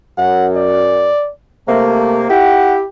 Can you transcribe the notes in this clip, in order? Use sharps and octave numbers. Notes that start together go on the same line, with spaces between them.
F#2 F#5
D5
C3 A3 A#3
E4 G4 F#5